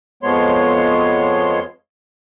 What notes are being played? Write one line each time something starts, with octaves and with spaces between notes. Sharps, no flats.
F2 F3 G#3 B3 C#5 C6